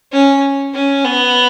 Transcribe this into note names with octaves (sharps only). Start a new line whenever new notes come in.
C#4
C#4
B3